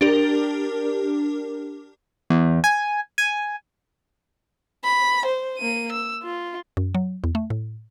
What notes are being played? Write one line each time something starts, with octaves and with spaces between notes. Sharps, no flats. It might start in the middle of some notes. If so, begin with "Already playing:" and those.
D4 G4 A#4
E2
G#5
G#5
B5
C5
A#3 D#7
E6
F4
F#2
F#3
E2
A3
A2